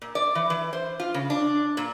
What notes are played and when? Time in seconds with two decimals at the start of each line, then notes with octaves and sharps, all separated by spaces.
0.02 A#2
0.15 D5
0.35 E3
0.50 E3
0.73 C5
1.00 F4
1.14 C#3
1.30 D4
1.77 A#2